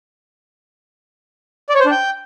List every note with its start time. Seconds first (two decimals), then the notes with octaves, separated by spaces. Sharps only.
1.69 D5
1.75 C#5
1.80 C5
1.86 D4
1.91 G5